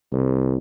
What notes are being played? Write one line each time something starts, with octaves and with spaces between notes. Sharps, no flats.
C2